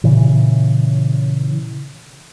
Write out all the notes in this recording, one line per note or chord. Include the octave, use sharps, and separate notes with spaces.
A#2 C#3 E3